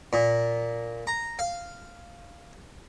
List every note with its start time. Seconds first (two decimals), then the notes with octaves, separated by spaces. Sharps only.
0.13 A#2
1.07 A#5
1.39 F5